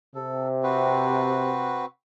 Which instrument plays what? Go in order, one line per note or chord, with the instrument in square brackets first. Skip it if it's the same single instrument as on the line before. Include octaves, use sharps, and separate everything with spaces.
[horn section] C3 [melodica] A4
[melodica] C4 F#4 B4